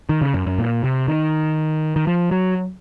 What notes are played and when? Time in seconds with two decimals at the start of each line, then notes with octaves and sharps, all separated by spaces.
0.09 D#3
0.21 C#3
0.34 F#2
0.46 F#2
0.58 A#2
0.84 C3
1.08 D#3
1.96 D#3
2.07 F3
2.31 F#3